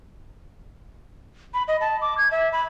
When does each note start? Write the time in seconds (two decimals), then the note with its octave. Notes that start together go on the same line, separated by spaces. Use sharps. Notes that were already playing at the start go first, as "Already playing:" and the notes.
1.54 B5
1.68 D#5
1.81 A5
2.01 D6
2.18 G#6
2.31 E5
2.53 B5